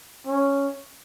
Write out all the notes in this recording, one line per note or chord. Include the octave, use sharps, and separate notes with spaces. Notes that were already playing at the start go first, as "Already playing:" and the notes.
C#4